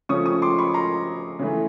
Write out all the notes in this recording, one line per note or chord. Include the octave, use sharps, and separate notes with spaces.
C#3 F3 A3 C#4 C#6 D#6
C#6 D#6
C6 D6
B5 C#6
A#5 C6
C#3 E3 A3